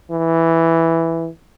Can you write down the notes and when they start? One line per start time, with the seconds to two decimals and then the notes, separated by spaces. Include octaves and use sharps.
0.11 E3